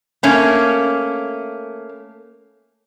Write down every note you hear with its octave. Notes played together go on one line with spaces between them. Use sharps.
A3 A#3 C#4